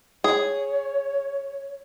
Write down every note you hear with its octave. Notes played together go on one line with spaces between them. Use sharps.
G#4 C#5